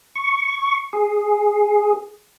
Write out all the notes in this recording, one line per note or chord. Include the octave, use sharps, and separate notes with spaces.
C#6
G#4